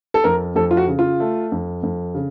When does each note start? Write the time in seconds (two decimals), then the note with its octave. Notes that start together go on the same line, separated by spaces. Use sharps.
0.14 A4
0.24 F2 A#4
0.56 F2 A4
0.71 F4
0.77 F#4
0.87 C#3
0.99 F4
1.20 A3
1.52 F2
1.83 F2
2.15 C#3